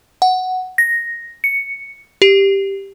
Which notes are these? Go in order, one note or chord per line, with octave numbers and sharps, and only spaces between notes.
F#5
A#6
C#7
G4